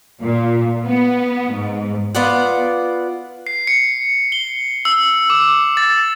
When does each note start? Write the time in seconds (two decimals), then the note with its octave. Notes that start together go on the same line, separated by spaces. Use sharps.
0.22 A#2
0.84 B3
1.53 G#2
2.15 B3 F4 D5 F#5
3.47 C7
3.67 C#7
4.32 G7
4.85 E6
5.30 D6
5.77 A6